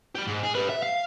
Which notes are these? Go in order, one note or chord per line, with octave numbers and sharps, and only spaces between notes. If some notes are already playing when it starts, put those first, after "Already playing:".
G4 B5
G#2
G#4
G4 B4
E5
F5